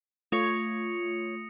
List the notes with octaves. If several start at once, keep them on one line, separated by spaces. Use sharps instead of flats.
A3 F4 C#5 D#6 A#6 C#7